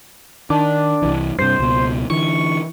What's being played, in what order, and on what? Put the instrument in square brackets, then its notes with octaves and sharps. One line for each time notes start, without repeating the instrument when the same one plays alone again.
[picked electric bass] D#3 [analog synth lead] D4
[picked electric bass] C2 E3
[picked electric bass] G2 C3 [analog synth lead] C5
[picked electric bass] C#2 B2
[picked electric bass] D3 E3 [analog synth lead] C#6